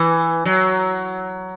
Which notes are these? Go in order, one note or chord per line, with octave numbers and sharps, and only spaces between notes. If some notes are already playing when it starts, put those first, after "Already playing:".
Already playing: E3
F#3